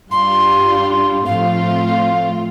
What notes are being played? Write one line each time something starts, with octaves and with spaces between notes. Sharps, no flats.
G2 G3 D4 F4 C6
A2 F3 A3 C4 F4 F5